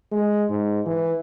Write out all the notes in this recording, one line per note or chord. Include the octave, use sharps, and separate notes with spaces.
G#3
G#2
E3